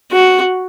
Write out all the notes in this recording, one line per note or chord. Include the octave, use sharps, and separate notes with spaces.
F#4